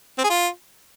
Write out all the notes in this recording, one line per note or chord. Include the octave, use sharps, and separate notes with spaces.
C4
G#4
F4